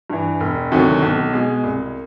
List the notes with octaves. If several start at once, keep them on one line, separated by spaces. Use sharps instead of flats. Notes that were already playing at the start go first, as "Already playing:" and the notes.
G2 E3
E1
D2 C3 D#3 F#3
B1
B2 G#3
C2